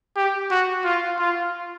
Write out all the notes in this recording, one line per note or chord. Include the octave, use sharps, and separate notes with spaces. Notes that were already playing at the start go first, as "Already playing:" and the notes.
G4
F#4
F4
F4